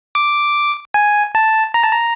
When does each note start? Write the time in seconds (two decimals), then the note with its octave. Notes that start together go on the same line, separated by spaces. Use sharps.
0.15 D6
0.94 G#5
1.35 A5
1.74 A#5
1.83 A5
1.92 A#5